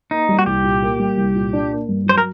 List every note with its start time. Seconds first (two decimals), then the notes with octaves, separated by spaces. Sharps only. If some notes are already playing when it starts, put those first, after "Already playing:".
0.11 A#3 D#4
0.29 G3
0.39 F#4
0.46 C2 G4
0.64 A#2
0.82 A#3
0.99 G3
1.17 C2
1.35 A#2
1.53 D4
1.71 A#3
1.89 G2
2.06 F#3 C5
2.18 A#4